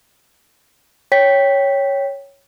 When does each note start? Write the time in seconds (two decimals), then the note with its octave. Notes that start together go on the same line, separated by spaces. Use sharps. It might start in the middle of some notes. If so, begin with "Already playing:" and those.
1.12 C#5 G5 B6